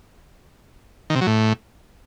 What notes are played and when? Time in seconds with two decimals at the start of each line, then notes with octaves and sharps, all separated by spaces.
1.10 D#3
1.16 C3
1.21 F#3
1.27 A2